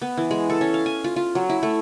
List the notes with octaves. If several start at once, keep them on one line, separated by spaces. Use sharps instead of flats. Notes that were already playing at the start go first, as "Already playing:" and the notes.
B3
E3
G#3
A4
C#4
F5
G#5
F4
F4
F#3
E4
A3